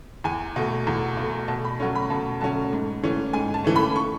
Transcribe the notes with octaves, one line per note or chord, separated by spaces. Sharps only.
E2 G#5
B2 A3
E2
B2 A3
B2 A5
B5
F#3 A3 C#4 C#6
B5
B2 A5
F#3 A3 C#4 A5
G#2
E3 A3 C#4
G#2 G#5
A5
E3 A3 C#4
B5
C#6